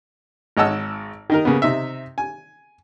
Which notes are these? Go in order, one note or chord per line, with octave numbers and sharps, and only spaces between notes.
G#1 C#5 D#5 F#5 A5 E6
D#3 D#4 A#4
C#3 A#3 B3
C3 D#4 E5
G#5